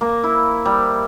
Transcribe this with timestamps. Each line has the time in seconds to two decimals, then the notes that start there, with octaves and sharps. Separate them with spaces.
0.01 A#3
0.24 E4
0.65 G3